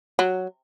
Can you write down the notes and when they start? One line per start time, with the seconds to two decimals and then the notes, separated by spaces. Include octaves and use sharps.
0.19 F#3